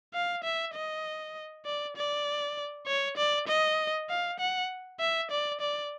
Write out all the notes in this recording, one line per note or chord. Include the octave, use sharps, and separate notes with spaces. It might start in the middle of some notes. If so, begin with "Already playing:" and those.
F5
E5
D#5
D5
D5
C#5
D5
D#5
F5
F#5
E5
D5
D5